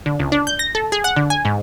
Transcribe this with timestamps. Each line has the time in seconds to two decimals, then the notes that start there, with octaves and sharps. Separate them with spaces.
0.06 D3
0.19 C#2
0.32 D4
0.47 G6
0.59 A#6
0.75 A4
0.92 G#4
1.04 F#5
1.16 D3
1.30 G#5
1.45 G#2